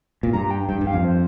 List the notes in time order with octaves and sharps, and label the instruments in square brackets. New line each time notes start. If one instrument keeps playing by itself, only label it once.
[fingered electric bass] A#2
[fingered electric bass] G2 [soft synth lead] A#5
[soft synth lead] G5
[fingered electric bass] G2 [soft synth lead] G5
[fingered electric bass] G2
[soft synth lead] F5
[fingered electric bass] F2
[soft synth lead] C5